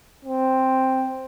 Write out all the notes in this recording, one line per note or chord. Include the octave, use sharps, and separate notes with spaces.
C4